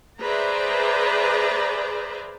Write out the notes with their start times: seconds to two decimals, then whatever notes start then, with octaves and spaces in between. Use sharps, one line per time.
0.21 G#4 B4 C5 D5 E5 A#5